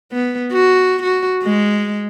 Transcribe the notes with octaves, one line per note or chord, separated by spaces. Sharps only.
B3
F#4
F#4
G#3